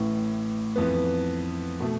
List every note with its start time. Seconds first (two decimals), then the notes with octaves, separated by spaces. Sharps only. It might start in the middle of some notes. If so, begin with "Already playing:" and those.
Already playing: A1 A2 E3
0.76 F2 E3 B3
1.80 B2 A3